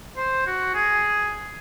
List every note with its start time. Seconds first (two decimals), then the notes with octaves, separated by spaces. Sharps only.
0.17 C5
0.47 F#4
0.75 G#4